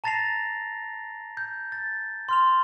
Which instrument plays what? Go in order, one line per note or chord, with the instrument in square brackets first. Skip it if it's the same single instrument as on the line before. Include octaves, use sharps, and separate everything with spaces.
[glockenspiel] A5 A#5 A6 A#6 C7 F7
G6
A6
C6 F6 F7